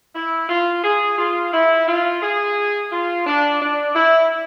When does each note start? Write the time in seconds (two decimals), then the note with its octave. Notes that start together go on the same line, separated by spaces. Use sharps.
0.15 E4
0.49 F4
0.84 G#4
1.18 F4
1.53 E4
1.87 F4
2.22 G#4
2.92 F4
3.26 D4
3.61 D4
3.95 E4